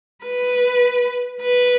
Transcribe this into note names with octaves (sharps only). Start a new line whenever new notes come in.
B4
B4